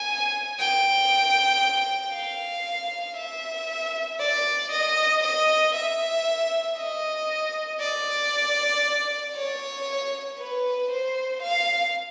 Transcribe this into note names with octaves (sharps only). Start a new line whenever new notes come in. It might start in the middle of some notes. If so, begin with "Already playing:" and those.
Already playing: G#5
G5
F5
E5
D5
D#5
D#5
E5
D#5
D5
C#5
B4
C5
F5